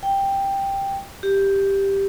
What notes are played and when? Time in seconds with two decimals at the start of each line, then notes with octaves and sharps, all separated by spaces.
0.03 G5
1.23 G4